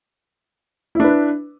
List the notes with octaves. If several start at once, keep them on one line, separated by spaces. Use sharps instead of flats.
D4 E4 B4